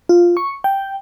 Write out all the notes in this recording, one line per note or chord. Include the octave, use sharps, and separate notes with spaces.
F4
C#6
G5